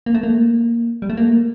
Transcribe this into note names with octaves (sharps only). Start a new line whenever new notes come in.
A#3
A3
A#3
G3
A3
A#3